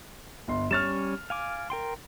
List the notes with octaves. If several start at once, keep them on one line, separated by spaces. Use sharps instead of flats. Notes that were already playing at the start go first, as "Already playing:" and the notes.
G1 C6
G3 C#4 C#5 F6 A6 E7
F5 G#5 D6
A#4 G5 C6